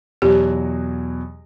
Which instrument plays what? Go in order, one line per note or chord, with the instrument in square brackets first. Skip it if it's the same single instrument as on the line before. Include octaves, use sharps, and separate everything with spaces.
[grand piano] E2 B2 F#3 [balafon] G4